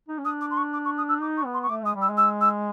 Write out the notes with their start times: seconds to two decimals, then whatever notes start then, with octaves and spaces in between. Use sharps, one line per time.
0.08 D#4
0.18 C#4
0.25 D4 D#6
0.41 D6
0.50 C6
0.57 C#6
0.73 D6
0.85 C#6
0.97 D#6
1.09 E6
1.21 D#4 D6
1.37 C#6
1.45 B3
1.54 C6
1.63 C#6
1.69 A3 D6
1.83 G#3 D#6
1.95 G3
2.01 E6
2.09 G#3
2.17 E6
2.41 E6